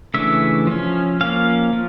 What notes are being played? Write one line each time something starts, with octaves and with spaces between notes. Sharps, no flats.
C#3 E3 A3 D4 E5
F3 C#4
F3 A#3 C#4 F5
F3